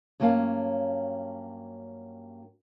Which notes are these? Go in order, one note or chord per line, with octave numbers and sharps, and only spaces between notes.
G2 F#3 A#3 C#4 F5 A5